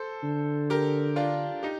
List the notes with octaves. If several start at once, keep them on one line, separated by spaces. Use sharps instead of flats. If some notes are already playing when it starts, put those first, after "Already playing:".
Already playing: A4 C5
D3
G4 A#4
D4 F4
D#4 G4